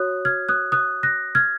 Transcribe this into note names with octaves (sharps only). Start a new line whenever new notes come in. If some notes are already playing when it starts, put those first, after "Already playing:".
Already playing: F#4 C#5 D#6 F#6
F6 G#6
D#6 F#6
D#6 F#6
F#6 A#6
F6 G#6